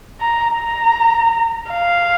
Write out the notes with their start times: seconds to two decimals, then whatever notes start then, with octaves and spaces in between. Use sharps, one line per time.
0.21 A#5
0.59 A#5
1.72 F5